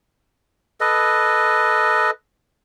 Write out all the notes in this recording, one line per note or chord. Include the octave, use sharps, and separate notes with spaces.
A4 B4 D#5